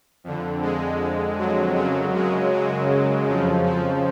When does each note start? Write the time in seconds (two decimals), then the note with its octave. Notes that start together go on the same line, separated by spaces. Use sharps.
0.24 F2 D3
0.62 G#3
1.38 F#3
1.76 F#2 C#3 F#3
2.14 G#3
2.53 F#3
3.28 F2 C#3 F3
3.66 F3